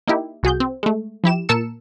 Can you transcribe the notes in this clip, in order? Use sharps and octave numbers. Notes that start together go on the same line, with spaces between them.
A#3 D#4 E4 G4
C2 F#4 G#4 G6
C4
G#3 A3
F3 E4 G4 E7
A#2 A#4 A5 E6 C#7 E7